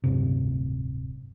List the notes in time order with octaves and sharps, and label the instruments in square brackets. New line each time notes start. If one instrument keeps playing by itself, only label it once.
[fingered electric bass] D1 G2 C3